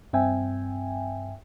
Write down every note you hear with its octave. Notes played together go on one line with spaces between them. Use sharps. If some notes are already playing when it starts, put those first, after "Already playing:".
G2 C4 E5 G5 G#5